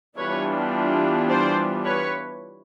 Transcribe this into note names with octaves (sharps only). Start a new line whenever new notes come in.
E3 G3 B3 D4 F4 B4 C#5
C5 D5
B4 C#5